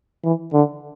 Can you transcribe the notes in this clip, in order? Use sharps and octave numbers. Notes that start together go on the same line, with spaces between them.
E3
D3